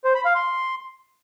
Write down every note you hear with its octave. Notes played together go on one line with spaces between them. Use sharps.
C5
B5
F5
C6